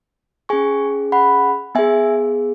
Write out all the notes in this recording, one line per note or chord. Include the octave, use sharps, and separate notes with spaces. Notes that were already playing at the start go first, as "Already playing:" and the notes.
C#4 G#4 G#5 C#6
F#5 B5
B3 G#4 E5 G#5